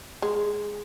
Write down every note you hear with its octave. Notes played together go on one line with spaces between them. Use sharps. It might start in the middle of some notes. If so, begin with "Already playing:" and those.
G#3